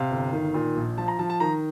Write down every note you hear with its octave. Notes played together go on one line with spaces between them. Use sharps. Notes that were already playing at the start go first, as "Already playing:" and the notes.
Already playing: C3 F5
G1
D#3
A#2
A#1
F3 A5
A#5
F3 A5
A5
D#3 A#5